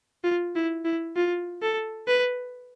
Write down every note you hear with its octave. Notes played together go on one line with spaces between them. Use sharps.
F4
E4
E4
F4
A4
B4